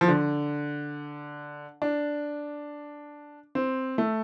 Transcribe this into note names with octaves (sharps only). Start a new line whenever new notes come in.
F3
D3
D4
C4
A3